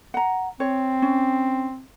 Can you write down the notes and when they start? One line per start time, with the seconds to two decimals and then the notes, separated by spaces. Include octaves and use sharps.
0.14 F#5 A#5
0.60 C4 C#5
1.02 C#4